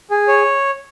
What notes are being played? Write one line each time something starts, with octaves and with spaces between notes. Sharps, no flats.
G#4
C#5